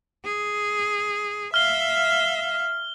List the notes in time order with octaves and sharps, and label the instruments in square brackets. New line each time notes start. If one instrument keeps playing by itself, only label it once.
[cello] G#4
[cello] E5 F5 [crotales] F6 G7